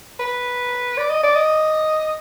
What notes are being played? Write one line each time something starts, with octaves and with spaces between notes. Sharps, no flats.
B4
D5
D#5
D5
D#5